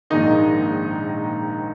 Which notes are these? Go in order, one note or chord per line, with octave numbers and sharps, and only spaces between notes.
A#1 G#2 D#3 A#3 D#4 D#5